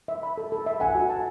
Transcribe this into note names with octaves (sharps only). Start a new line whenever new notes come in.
E5
B5
A4
A4
E5
F#5 G#5
F#4
A5